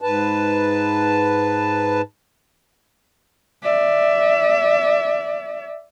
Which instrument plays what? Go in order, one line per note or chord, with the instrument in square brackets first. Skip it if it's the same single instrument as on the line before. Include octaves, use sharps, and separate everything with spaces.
[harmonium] G#2 B4 A5
[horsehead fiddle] D5 E5